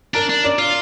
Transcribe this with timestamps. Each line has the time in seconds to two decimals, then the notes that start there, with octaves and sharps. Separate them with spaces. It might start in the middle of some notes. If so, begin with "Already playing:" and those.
0.14 D4 A#4
0.29 D4
0.44 D5
0.59 F4